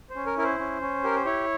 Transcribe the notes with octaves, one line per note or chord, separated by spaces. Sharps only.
C5
C#4
A#4
E4 A#4
C5
C#4
C#4
G4 A#4
C5
E4 C#5